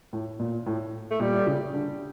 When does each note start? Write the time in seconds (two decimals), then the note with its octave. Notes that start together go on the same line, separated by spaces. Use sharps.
0.13 A2
0.39 A#2
0.66 A2
1.11 A3
1.20 A#2 G3
1.47 C#3
1.74 D3